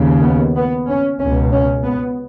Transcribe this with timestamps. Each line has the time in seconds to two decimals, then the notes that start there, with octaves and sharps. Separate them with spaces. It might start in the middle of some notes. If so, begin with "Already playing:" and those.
Already playing: D#2 C#3
0.22 B3
0.55 B3
0.88 C#4
1.20 C#2 B2 C#4
1.52 C#4
1.85 B3